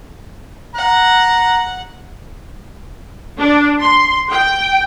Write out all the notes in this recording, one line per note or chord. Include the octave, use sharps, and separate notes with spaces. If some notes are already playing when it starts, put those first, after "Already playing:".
F#5 A#5
D4
C6
G5